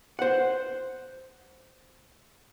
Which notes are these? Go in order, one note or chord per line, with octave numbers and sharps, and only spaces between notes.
C5 F#5